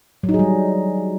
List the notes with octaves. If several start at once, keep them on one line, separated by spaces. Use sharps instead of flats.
F#3
D#4
G#4
G3